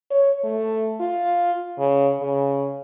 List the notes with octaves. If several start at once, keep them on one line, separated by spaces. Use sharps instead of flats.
C#5
A3
F4
C#3
C#3